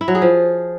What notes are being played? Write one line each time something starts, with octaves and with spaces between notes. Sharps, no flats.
E4
F#3
G#4
F3